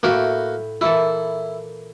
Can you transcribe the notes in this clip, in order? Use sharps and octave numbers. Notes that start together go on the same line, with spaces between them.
A2 A#3 E4 F#4 G5
A#2 E3 E4 A4